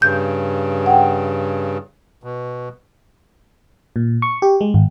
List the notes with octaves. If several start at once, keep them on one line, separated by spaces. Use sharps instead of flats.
G2 C#3 G6
F#5 G5
B2
A#2
C#6
G4
G#3
G#1